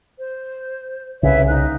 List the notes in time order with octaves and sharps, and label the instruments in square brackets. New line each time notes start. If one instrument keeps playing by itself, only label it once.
[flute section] C5
[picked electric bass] C2 C#3 [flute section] B4 C#5 E5
[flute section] D#4 F#6